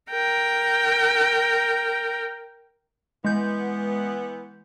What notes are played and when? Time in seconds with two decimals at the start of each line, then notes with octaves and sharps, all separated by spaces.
0.11 A#4 G5
3.25 E3 G#3 B3 G6